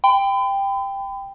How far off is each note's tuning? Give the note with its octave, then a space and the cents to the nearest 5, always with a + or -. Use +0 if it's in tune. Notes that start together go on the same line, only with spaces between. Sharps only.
G5 +10 B5 +40